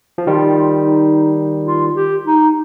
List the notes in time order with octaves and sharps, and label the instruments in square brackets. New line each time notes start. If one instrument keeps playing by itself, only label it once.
[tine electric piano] F3
[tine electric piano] D#3 G3 [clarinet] F4
[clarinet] D#4
F4
G4
D#4